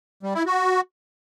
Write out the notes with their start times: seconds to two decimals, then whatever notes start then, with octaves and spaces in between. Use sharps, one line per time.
0.23 G3
0.35 E4
0.46 F#4